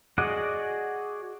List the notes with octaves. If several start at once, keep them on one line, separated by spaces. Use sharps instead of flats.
F#4 G#4 D5 D#5 F#5